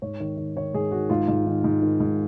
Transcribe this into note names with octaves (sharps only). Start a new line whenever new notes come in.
G#2 C#5
D#3
D#3
D#3 C#5
G#2 G#4
D#3 F#4
G#2 F4
G#2
D#3
G#2
D#3
G#2